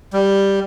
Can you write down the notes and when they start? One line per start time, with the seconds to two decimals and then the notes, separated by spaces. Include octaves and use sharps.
0.13 G3